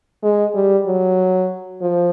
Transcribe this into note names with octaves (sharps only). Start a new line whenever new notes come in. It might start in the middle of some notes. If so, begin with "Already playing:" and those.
G#3
G3
F#3
F3